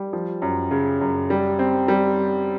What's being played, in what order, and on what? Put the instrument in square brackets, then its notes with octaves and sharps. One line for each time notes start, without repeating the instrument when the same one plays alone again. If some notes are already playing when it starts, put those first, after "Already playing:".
Already playing: [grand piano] G3
F3
F#2
C#3
F#2
G3
C4
G3